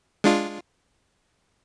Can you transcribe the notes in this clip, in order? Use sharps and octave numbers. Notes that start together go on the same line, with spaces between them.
G#3 D4 F4